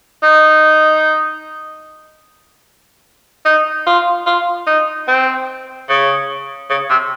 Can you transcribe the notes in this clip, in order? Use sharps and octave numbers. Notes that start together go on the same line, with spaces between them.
D#4
D#4
F4
F4
D#4
C4
C#3
C#3
C3